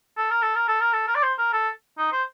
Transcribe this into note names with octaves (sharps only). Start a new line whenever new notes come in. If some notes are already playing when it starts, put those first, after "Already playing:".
A4
A#4
A4
A#4
A4
A#4
A4
A#4
D5
C5
A#4
A4
D#4
C5